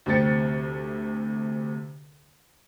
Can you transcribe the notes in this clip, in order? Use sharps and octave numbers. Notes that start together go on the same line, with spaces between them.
D2 C3 C4 G4 A6 C#7